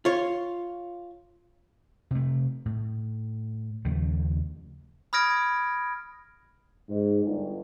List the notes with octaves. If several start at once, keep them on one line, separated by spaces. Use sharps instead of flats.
F4 C#5
C3 A3
A2
D#2 C#3 F3 A3
B5 D#6 F6 G#6 A#6 D7
G#2
G1